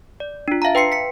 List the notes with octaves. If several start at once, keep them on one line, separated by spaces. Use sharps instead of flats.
D5
D4 F4
E5 F5 A5 A#5
B4 G5 C6 C7 C#7
B6 C#7